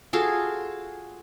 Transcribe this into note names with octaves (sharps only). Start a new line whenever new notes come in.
F4 F#4 G#4 A4